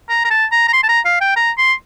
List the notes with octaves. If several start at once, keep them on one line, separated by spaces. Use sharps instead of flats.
A#5
A#5
A5
A#5
A#5
C6
A5
A#5
F5
G5
A#5
C6